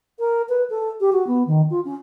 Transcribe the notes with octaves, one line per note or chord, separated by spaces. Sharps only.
A#4
B4
A4
G4
F#4
B3
D#3
F4
C#4